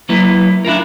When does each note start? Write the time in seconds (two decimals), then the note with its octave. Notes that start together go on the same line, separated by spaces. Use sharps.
0.09 F#3 A#3 E4 B4
0.65 D4 E4 F4 A#4